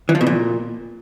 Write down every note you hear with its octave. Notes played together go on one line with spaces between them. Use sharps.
E3
F3
B2
A#2